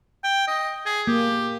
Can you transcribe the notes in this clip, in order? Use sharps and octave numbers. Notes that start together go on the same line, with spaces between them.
G5
D#5
G#4
A#3 G4